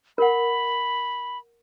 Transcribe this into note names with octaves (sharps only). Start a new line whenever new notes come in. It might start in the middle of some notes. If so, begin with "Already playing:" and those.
A#4 F#5 B5